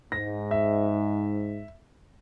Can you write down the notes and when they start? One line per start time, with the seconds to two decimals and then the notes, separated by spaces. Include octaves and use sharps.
0.12 G#2 A#6
0.51 E5